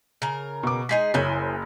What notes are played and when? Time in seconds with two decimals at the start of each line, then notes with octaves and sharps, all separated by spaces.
0.22 C#3 A#4
0.63 B2 D6
0.89 G#3 D#4 G#4 B6 C7
1.14 F#1 E4 C5 C#5 G#5 G6